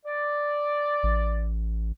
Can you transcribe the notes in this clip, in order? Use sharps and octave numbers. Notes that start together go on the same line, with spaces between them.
D5
A1